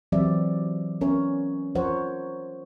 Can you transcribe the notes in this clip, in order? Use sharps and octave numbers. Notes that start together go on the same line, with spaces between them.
E3 F#3 C4 G4 D5 E5
B3 C#4 A#4 C#5 E5
F3 A#4 C5 C#5 F#5